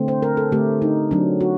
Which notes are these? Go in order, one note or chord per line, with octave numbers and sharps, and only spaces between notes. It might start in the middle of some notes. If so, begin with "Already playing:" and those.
Already playing: D3 A3 C4
C5
A#4
A4
D3 A3 C4 G4
D#4
F#3 C4 D4
F#4